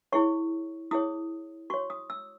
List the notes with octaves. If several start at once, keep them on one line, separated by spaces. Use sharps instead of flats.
E4 G#4 C#5 C#6
E4 G#4 C#5 D#6
F#4 C#5 C#6
D#6
E6